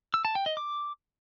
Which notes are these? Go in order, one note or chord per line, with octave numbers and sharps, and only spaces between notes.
E6
A5
G5
D#5
D6